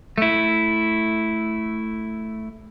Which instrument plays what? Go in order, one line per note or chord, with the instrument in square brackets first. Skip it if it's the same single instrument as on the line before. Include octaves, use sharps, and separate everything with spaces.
[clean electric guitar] A3 E4